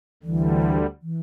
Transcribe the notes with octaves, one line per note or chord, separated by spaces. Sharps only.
D2 D3 E3 G3
E3